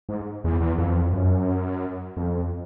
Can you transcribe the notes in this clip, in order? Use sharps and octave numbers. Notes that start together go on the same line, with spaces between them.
G#2
E2
E2
F2
F#2
F2